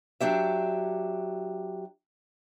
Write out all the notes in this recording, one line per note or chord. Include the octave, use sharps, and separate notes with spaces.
F#3 D4 G4 E5